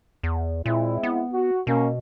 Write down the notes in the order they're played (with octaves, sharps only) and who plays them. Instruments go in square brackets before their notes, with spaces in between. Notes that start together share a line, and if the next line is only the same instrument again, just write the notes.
[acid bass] E2
[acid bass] A#2 [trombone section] G#3 C4 E4
[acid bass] B3
[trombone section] F#4
[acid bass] B2 [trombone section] A#3 C#4